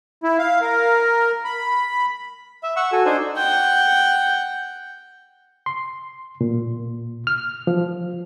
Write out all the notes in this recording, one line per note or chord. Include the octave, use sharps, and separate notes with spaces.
E4
F5
A#4
B5
E5
F#5 C#6 E6
F#4 A4 G#5
D4 D#4 C5 G#5
F#5 G5
C6
A#2
F6
F3